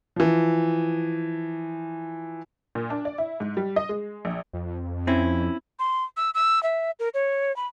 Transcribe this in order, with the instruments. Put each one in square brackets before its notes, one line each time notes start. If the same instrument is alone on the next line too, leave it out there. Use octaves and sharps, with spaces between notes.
[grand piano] E3 F3
[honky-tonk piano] A#2
D4
D5
E4
G#2
G3
D#5
G#3
A#1
[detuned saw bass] F2
[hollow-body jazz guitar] C4 C#4 E4
[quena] C6
E6
E6
E5
A#4
C#5
B5